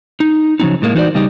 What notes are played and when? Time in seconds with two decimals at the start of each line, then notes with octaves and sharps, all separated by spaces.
0.20 D#4
0.60 C#3 F3 F#3 C4 D#4
0.82 A2 G#3 A#3
0.95 E3 D#4 F#4 C5 D5
1.15 C#3 G3 D#4 G4